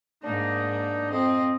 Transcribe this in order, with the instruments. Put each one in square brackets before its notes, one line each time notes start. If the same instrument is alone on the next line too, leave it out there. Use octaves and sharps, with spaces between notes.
[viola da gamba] G#2 A#3 [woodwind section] D4 D#4
[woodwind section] F2 D#5 [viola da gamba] C4